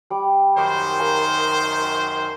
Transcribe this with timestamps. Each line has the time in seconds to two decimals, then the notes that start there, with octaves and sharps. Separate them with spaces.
0.10 G3 D6
0.57 F#2 D#3 C5 D6
0.99 A#4 F5 G#5